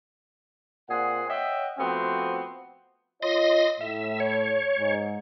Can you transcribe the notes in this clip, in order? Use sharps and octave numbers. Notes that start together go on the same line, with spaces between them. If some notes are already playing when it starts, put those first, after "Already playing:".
A#2 C4 G#4 F#5
C#5 D#5 E5 F#5 G5
F3 A3 B3 C4 F#4
F4 C#5 D#5 C6 D#6 A#6
A2 E5
C#5
G#2